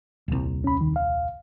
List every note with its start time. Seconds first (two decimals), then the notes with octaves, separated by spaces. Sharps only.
0.28 D#1 C2
0.64 C#4 B5
0.81 D#3
0.96 F5